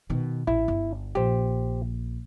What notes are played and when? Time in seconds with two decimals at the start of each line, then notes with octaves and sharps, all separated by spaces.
0.10 B2 D#3
0.47 A1 E4
0.68 G1
1.15 A#1 G4 C5